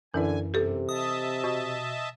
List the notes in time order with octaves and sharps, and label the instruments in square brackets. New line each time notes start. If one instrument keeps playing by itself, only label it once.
[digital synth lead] F#2 [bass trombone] D3 [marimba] E3 E4 B4 [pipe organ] G#5
[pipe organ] G2 [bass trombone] C3 [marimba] G4 A4
[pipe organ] D#5 E5 A5 [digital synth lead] D#6
[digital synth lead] B2